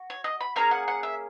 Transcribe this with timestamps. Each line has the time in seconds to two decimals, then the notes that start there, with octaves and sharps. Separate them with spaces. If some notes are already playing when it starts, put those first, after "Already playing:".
Already playing: F#4
0.10 C#5
0.24 D#5
0.41 B5
0.56 A#3 C#4 G#4 A#5
0.71 F#5
0.88 F#5
1.03 E5